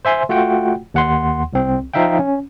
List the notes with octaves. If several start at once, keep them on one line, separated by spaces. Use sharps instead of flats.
C5 E5 G#5 C6
A3 F4 F#4 F#5 G5
D#2 F#5 C6
C2 C4
F3 D#4 E5 F5 G5
C#4